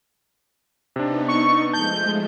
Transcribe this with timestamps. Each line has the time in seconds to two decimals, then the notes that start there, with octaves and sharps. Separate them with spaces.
0.96 C3 B3 D4 D#4
1.28 C#6
1.73 F3 G#3 A3 A5 G6